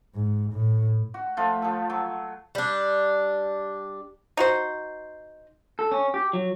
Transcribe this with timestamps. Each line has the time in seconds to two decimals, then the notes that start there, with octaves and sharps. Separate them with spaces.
0.15 G#2
0.52 A2
1.14 F#4
1.37 F3 A3 F4
1.62 F3 A4
1.90 F#3
2.55 G3 D4
4.37 D#4 F#4 C5
5.79 A4
5.92 C#4
6.14 G4
6.33 F#3